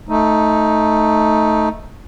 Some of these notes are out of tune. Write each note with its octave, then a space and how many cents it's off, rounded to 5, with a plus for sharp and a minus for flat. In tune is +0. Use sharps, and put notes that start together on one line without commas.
A3 +0 D#4 +10